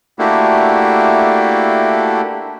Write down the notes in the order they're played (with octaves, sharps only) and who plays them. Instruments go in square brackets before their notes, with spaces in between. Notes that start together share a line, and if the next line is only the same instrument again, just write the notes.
[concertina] A3 A#3 D4 E4 F#4 G4